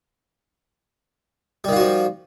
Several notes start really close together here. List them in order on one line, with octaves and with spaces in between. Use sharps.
G3 D#3 F4 F#4 F3